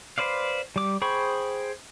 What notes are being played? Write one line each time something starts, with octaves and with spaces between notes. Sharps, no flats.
B4 C5 D5 F5
G3 D6
G#4 C5 G5 B5 C#6